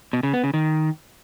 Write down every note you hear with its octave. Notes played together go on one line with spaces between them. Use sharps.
B2
C#3
B3
C#3
D#3